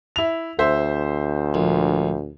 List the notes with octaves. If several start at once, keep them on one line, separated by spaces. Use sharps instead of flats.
E4 F7
D2 C5 E5
A#1